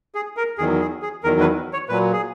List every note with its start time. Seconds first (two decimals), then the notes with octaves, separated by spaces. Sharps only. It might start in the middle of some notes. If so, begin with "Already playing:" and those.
0.15 G#4
0.37 A#4
0.58 E2 D#3 F#3 G#4
0.80 G#4
1.02 G#4
1.24 E2 D#3 F#3 A#4
1.40 B4
1.73 C#5
1.89 A#2 F#3 B4
2.13 G#4